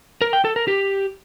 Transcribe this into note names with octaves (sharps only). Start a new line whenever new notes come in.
A#4
G5
A4
A#4
G4